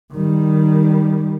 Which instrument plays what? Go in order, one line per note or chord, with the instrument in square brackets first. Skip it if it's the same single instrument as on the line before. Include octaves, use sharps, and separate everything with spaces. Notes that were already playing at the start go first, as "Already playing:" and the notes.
[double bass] D#3 G3